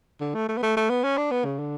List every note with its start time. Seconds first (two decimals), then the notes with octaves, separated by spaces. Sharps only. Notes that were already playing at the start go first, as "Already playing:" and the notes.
0.21 D3
0.35 A3
0.49 A3
0.57 B3
0.63 A3
0.77 A3
0.90 B3
1.04 C#4
1.18 D4
1.31 B3
1.45 C#3
1.59 D3